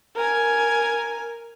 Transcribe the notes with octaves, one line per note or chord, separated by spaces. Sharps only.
A#4 G#5